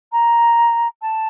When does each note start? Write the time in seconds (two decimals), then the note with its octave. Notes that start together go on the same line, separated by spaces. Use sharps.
0.12 A#5
1.02 A5